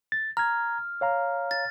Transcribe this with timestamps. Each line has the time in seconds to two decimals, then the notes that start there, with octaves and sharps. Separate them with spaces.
0.12 A6
0.37 A#5 F6 G#6
1.01 C#5 F5 A#5
1.51 A6